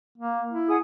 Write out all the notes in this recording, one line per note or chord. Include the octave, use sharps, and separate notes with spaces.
A#3
E4
G#4 F#5 D#6